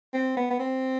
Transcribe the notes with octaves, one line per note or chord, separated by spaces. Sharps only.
C4
B3
B3
C4